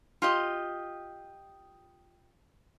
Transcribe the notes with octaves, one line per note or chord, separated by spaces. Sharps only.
F4 G4 D#5